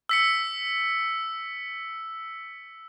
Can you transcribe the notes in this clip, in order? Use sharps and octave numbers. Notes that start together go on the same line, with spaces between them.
E6 B6 C#7